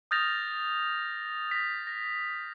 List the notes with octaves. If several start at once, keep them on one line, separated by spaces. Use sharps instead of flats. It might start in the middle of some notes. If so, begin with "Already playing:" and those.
D#6 F6 G6 A6 A#6 F7
A#6 B6
A#6